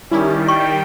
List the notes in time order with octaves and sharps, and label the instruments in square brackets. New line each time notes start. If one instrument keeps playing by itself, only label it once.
[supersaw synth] D#3 G3 [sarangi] C#4 [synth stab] E4
[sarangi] G5 [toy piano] C#6